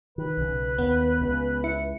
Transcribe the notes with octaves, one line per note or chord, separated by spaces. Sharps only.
D#3 B4
B1 C#3
D#2 B3
C#2 C#3
E4 C#7